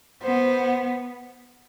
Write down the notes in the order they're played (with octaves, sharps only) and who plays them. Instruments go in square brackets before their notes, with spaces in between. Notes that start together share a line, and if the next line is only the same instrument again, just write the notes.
[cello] B3 [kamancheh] C5